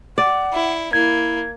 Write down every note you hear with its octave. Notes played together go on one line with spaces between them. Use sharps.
D5 F#5
E4
A#3 E4 G#6